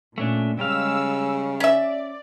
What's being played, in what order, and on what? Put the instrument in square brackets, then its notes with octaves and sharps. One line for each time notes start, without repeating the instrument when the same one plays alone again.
[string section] A#2 [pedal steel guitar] A3 C#4 D4
[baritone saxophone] C#3 [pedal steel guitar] G3 F5 [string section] G#3 E6
[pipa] C#4 E5 [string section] D5